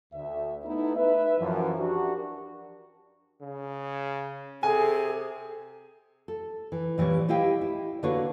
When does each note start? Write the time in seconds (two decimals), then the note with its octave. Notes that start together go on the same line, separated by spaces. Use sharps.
0.13 D2 E5
0.65 A3 B3 D#4 E4
0.95 B4 E5
1.39 F#2 E3 F3
1.78 D4 F#4 G4 A#4
3.41 C#3
4.63 C3 G#4 A4 G#5
6.28 A4
6.72 E3
6.98 A#2 E3 G3 C4 C#5
7.29 E4 G4 D#5 F5 G5
7.61 E4
8.03 D3 A#3 D4 F#4 B4 C#5